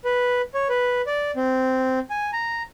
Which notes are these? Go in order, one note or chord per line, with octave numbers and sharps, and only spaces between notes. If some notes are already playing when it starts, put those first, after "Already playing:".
B4
C#5
B4
D5
C4
G#5
A#5